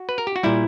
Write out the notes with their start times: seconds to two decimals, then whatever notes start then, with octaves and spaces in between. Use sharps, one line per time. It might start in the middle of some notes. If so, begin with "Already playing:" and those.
Already playing: F#4
0.09 B4
0.18 A#4
0.27 G4
0.36 F#4
0.43 A#2 G3 E4